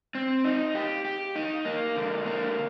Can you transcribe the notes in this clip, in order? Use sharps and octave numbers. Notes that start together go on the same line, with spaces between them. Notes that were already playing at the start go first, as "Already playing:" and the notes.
C4
D#4
G4
G4
D#4
A#3
D3
A#3